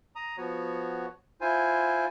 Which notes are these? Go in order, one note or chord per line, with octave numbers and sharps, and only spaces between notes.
A#5 D#6
F3 B3 F#4 C#5
E4 F4 C5 G#5